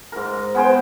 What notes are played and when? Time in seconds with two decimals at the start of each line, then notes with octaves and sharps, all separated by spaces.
0.12 G#2 A#4
0.55 B3 G#4 C5 G5